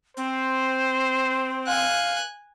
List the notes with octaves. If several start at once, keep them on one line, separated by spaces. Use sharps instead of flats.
C4 C5
F5 G#5 F#6